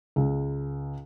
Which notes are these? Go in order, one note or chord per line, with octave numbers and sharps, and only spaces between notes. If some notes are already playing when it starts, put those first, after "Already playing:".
C#2